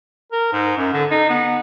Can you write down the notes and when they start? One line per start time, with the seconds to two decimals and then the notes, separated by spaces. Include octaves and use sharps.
0.32 A#4
0.53 G#2
0.77 F#2
0.93 D3
1.11 D#4
1.30 B3